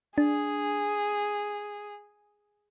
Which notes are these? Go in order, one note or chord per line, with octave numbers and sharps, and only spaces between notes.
D4 G#4